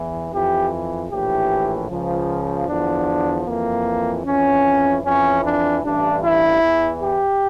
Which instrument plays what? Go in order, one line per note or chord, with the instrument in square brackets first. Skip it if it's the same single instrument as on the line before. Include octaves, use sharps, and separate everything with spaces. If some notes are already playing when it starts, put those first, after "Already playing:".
Already playing: [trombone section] E2 E3
F2 E3 G4
A#1 A2 E3 G4
C#2 C#3 F3
E2 D3 F3 D4
F2 E3 A#3
F2 E3 C#4
F2 E3 C#4
D4
A1 G2 E3 D4
E4
E2 E3
G4